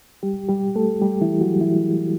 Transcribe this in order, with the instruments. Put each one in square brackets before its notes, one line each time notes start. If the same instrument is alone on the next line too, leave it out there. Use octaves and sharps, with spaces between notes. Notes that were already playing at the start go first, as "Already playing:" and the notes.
[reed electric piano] G3 G4
G3 G4
A3 A4
G3 G4
E3 E4
F#3 F#4
E3 E4